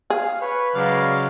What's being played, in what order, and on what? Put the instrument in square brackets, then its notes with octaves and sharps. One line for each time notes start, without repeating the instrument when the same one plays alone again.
[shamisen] G#4 [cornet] F5
[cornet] B4 [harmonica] C#5
[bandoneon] C#3 F#3 [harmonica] G#3 D5 F5